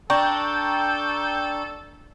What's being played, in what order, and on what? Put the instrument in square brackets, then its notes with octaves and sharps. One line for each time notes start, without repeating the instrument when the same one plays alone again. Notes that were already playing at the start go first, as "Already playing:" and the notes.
[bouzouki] D4 [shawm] A4 [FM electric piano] G5 A#5 C#6 [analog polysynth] G6